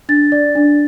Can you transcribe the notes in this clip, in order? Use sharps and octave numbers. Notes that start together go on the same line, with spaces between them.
D4 A6
D5
D4